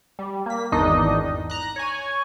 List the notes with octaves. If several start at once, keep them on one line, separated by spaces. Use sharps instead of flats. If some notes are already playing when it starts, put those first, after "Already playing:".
G3
A#3 B6
G#1 E2 D#3 D4 D#4 D#5
A#5 F#6
C#5 G#5